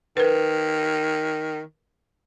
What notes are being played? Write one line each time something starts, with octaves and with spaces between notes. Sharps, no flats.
D#3 A#4 B4